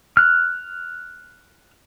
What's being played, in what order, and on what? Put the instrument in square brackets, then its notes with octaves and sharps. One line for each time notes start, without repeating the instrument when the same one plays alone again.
[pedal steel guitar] F6 F#6